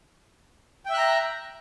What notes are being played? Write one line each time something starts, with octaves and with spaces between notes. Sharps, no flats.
E5 G5 A#5 F#6